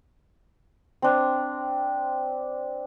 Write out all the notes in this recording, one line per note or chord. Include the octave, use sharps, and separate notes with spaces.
C4 D4